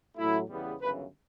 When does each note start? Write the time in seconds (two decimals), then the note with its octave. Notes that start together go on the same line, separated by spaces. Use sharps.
0.17 A1 A2 F#3 A3 E4
0.49 E2 C#3 E3 G3 B3
0.80 G1 F#2 C#3 E3 B4